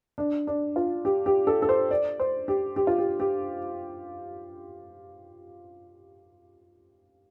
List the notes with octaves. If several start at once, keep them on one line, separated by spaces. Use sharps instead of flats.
D4
D4
F4
G4
G4
A4
A4
C5
D5
C5
G4
G4
F4
G4
G4